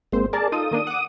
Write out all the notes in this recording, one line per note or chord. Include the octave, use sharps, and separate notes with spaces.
G#1 G#3 A#3 C4 C5
G#4 A#4 D5 A5
D#4 F4 A4 D#6
D#3 A#3 D4
F#5 D6